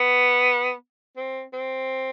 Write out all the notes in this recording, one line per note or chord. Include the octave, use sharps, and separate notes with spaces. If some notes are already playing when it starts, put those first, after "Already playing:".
Already playing: B3
C4
C4